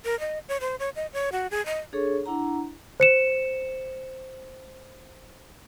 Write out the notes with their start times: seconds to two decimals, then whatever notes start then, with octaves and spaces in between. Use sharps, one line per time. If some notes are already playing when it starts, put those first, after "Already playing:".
0.05 A#4
0.20 D#5
0.49 C#5
0.61 C5
0.79 C#5
0.96 D#5
1.13 C#5
1.32 F#4
1.51 G#4
1.66 D#5
1.93 D4 G#4 A4 C#5 C#6
2.26 D4 E4 F#5 A#5
3.00 C5 C#7 E7